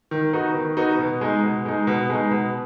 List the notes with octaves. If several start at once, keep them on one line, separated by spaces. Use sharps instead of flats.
D#3
B3 D#4 F#4
D#3
B3 D#4 F#4
B2
G#3 D#4
B2
G#3 D#4
B2
G#3 D#4
B2